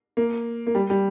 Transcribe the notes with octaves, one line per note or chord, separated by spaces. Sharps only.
A#3
A#3
G3
G3